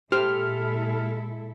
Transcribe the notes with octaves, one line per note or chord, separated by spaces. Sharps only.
A#2 G#3 E4 G4 A4 C5 F6